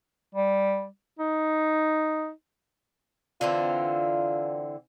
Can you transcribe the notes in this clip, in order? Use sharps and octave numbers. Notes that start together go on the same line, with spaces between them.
G3
D#4
D3 E3 C4 F4